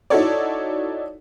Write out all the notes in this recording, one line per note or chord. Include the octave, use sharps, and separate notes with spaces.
D#4 E4 F#4 A4 C#5 D5